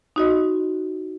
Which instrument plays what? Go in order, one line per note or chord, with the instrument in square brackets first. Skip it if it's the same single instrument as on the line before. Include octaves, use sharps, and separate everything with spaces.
[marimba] D#4 F#4 D#5